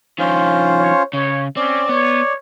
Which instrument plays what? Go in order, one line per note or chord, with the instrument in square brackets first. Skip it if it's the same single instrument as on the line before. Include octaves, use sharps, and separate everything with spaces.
[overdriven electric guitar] D#3 F3 [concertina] C#4 F4 C5
[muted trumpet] C#5
[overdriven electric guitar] C#3 [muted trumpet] C#5
[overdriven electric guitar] C4 [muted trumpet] C#4 [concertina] D5
[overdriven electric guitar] B3 [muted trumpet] C#5